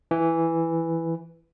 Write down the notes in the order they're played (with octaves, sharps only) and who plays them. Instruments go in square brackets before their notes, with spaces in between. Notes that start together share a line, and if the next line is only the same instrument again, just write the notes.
[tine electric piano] E3